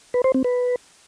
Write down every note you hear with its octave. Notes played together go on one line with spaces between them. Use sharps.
B4
C5
C4
B4